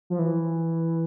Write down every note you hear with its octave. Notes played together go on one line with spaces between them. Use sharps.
F3
E3